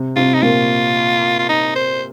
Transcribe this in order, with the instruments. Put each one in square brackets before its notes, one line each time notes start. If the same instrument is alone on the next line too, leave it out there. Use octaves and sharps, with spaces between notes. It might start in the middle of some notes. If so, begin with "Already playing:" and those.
Already playing: [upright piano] C3
[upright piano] C3 C4 [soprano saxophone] F4
[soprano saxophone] D#4
[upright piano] A#2 A#3 [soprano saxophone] F4
[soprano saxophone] F4
D#4
C5